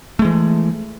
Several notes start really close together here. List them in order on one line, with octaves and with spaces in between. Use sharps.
A3 G#3 E3